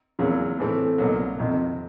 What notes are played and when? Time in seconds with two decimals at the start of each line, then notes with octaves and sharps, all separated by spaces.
0.19 E2 C#3 F#3 A#3
0.59 A2 E3 A3 C4
0.98 C2 B2 F#3 A#3
1.39 F2 C3 D#3